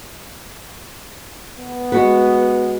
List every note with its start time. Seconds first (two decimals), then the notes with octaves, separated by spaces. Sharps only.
1.59 B3
1.92 G#3 F#4 B4